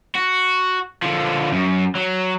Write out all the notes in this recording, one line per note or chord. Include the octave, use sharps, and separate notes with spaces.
F#4
D3 F3
F#2
F#3